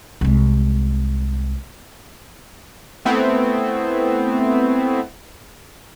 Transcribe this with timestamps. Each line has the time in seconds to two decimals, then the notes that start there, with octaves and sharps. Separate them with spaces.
0.21 C2 G#3
3.05 A3 B3 C4 E4